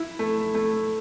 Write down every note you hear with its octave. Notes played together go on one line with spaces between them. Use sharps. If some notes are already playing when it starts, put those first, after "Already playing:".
Already playing: E4
A3
A3